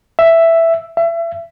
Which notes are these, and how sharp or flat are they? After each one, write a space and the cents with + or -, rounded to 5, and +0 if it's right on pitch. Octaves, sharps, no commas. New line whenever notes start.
E5 +5
E5 +30